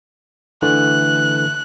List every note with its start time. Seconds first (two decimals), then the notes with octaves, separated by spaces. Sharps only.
0.62 D3 E3 A3 F#6